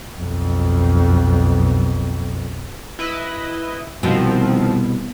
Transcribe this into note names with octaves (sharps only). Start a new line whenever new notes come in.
B1 F2
E4 B4 D#5
C2 B2 D#3 F3 C4